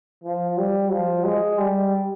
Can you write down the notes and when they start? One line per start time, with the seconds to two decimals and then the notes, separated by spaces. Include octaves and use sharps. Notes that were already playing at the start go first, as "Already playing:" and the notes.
0.24 F3
0.58 G3
0.91 F3
1.24 G#3
1.59 G3